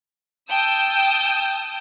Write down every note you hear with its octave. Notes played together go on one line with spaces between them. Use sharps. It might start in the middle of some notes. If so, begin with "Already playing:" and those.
G5 A5 D#6 E6 G6